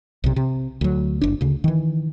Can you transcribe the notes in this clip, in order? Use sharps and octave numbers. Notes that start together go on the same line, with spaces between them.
B1 C3
C3
D2 F#3
F#1 D4
D2 C#3
D#3 E3